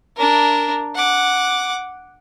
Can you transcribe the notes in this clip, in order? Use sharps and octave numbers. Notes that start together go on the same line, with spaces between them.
D4 A#4
F#5 D6